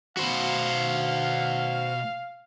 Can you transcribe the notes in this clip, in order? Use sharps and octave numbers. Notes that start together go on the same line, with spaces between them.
B2 F#4 C5 F5 B5